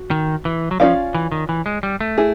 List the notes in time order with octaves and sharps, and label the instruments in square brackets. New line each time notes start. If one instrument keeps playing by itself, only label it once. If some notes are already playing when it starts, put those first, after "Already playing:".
Already playing: [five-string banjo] F#4
[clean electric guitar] D#3
E3
F#3
[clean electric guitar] F3 [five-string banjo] C#4 F4 A#4 D5 F5
[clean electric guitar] E3
D#3
E3
G#3
G3
A3
[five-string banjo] E4 G#4